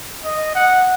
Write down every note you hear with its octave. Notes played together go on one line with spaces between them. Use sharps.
D#5
F#5